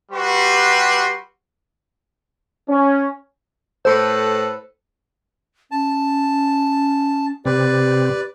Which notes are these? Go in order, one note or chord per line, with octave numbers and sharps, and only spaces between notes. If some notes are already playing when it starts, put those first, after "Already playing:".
G3 F#4 G4 B4 C6
C#4
A2 A4 B4 C5
C#4 A5
C3 C4 G4 B4 D5